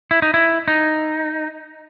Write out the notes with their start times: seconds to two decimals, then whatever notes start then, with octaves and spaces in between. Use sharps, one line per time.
0.11 E4
0.22 D#4
0.34 E4
0.68 D#4